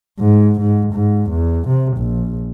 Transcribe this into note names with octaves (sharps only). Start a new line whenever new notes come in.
G#2
G#2
G#2
E2
C3
A#1